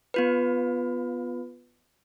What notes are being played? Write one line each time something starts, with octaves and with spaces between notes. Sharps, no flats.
B3 F4 B4